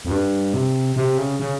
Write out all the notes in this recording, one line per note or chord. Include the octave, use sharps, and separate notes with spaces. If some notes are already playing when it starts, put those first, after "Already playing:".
F2
G2
C3
C3
C#3
C#3